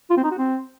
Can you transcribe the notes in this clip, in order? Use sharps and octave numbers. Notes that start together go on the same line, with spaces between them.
F4
C4
D#4
F#4
C4